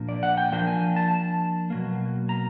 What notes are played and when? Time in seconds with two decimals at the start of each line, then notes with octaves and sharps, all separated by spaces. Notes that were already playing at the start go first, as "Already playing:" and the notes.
Already playing: A#2 F3 A#3 D4
0.09 D5
0.23 F#5
0.37 G5
0.52 F3 A#3 D4 G5
0.67 G#5
0.96 A5
1.11 A5
1.70 B2 F#3 A#3
2.29 A#5